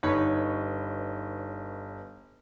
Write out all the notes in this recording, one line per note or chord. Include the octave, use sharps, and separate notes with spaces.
G1 D#4 B4 C#5